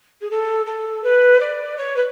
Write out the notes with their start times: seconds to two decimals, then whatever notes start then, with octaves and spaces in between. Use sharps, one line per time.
0.21 G#4
0.30 A4
0.66 A4
1.03 B4
1.40 D5
1.77 C#5
1.96 B4